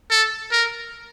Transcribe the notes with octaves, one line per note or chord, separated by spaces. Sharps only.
A4
A#4